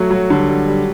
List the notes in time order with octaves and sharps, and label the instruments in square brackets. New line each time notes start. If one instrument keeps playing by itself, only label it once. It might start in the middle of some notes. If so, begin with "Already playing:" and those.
Already playing: [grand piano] F#3 A3 F#4
F#3
[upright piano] D3 [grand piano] G3
[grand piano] G3
G3